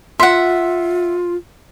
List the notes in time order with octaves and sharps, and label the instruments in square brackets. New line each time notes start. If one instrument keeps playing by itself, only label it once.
[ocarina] F4 [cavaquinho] E5 F#5 [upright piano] C6